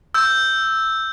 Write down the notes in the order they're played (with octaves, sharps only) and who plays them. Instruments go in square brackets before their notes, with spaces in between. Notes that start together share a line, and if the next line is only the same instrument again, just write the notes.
[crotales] E6 G6